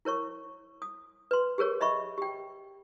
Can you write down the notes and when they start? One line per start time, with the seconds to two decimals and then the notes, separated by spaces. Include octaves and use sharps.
0.05 E4 A#4 C#5 C#6
0.82 D#6
1.31 B4 C6
1.58 G4 G#4 A#4 C#5
1.81 D#5 E5 B5 C#6
2.18 G4 G5